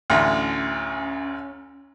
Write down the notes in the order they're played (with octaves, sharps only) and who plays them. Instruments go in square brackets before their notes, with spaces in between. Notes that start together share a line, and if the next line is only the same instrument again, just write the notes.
[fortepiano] A1 D2 [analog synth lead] C#4